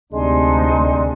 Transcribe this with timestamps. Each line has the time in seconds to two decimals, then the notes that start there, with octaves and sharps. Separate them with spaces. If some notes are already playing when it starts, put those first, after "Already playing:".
0.13 D2 C3 G#3 D4 D#4 G#5 C6